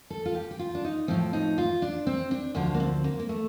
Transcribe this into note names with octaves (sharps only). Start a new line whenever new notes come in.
A4
F4
G4
G4
F4
D4
D#4
A2 F3 C4
D#4
F4
D4
C4
D4
D2 D3 F3 D4
A#3
C4
A#3
A#3
A3